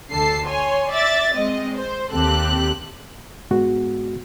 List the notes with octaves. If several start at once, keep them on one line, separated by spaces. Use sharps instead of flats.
D2 D3 A4 C7
C#5 G#5 C6
D5 E5 A6
G#3 C4 D#5
C5
D#2 C4 G4 A4 F#6
G#2 G#3 B3 F#4